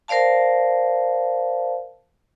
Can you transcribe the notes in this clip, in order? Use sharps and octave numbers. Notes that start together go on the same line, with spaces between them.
A#4 C5 D5 F5 A5